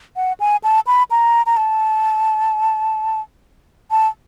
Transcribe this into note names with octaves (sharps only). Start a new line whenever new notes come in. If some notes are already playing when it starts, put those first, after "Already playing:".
F#5
G#5
A5
B5
A#5
A#5
A5
A5